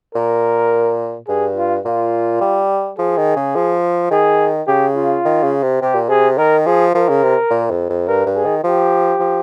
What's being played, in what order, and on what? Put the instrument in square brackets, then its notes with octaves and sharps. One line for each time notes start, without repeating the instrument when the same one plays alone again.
[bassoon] A#2 [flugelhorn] A#4
[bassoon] G2 [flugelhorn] G#4
[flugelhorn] F4
[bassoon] A#2 [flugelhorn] F4
[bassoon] G3
[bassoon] F3 [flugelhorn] G#4
[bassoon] D#3
C#3
F3
[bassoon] D#3 [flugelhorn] G#4
[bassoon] C#3 [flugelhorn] G4
[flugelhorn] F4
[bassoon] D#3
C#3
C3
[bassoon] C3 [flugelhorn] G4
[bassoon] A#2
[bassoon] C3 [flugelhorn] G#4
[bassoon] D#3 [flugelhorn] A#4
[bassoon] F3 [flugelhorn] G#4
[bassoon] F3 [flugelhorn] A#4
[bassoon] C#3
C3
A#2
F2
F2
[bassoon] G2 [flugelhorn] A#4
[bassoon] G2
[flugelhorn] G#4
[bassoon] D#3
[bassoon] F3 [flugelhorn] G4
[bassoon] F3